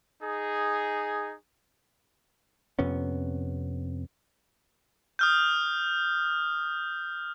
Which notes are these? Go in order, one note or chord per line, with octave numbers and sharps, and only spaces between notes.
D#4 G#4
F2 C3 B3 C#4
D#6 F6 G6